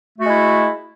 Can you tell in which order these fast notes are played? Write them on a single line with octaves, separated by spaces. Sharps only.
A3 F#4 G#3 E4